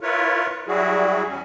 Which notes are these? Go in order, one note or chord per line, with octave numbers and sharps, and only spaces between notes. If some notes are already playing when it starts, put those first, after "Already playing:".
E4 F4 A#4 B4 C#5
F#3 G3 E4 F#4 G#4
E2 F#3 C#4